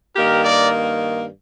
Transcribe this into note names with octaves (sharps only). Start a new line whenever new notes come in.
G2 D#3 A#3 G4 A#4
A#4 D5